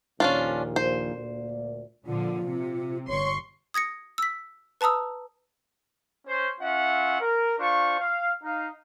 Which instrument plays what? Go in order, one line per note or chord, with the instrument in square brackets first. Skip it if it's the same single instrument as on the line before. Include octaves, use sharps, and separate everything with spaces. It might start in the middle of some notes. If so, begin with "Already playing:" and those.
[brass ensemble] A#1 D#2 A#2 [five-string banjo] C#4 D4 F4
[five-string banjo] C5
[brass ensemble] D2 A#2 D5
[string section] A#2 D3 F3 [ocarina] F4
[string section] C3
[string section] G1 C6 C#6 [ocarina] C#5
[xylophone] D#6 G#6 A#6 C#7
E6 B6
B4 A5 A#5 D#6 E6
[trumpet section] C#4 C5
C#4 F4 E5 F#5
A#4
D4 F4 C5 C#6
F5
D#4 F5